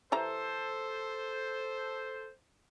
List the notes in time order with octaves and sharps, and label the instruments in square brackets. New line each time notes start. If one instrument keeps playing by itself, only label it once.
[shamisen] E3 G4 A#5 [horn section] A4 C5